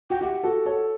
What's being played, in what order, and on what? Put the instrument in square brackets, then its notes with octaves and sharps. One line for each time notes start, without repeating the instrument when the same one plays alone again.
[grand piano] F#4 [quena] G5
[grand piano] E4 G4 [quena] F#5
[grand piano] F#4 A4
A4 C#5